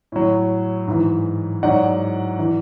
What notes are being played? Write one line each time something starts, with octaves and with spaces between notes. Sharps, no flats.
A2 F#3
G#2 E3
G#2 F#3 D5 F#5
E3